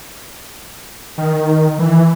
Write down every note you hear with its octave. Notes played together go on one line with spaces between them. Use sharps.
D#3
E3